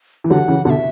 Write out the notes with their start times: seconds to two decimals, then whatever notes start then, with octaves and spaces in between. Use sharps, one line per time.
0.24 E3
0.30 D3 F#3 F#5
0.48 C#3 E3
0.65 B2 D3 F#5
0.70 E5